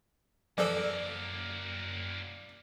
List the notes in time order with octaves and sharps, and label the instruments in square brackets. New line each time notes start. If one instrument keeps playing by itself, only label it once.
[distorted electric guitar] F#2 A#3 [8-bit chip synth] E3 F3 A4 [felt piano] D5